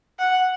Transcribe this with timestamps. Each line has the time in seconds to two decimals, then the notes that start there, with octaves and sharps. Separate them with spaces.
0.19 F#5